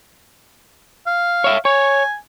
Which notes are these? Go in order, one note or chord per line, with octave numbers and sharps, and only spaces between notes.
F5
C#5 E5
C#5 G#5